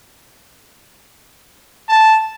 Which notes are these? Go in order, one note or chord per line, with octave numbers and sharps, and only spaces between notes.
A5